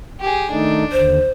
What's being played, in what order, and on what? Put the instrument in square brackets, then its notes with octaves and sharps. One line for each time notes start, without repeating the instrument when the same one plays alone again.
[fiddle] G4 G#4
[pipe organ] D#3 A3 D#4 [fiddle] D4
[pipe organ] D#2 D3 [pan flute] C5